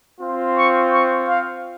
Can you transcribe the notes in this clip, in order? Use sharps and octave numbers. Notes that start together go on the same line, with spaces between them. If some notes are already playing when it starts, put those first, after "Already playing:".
C4 F4
C#6
C#6
F5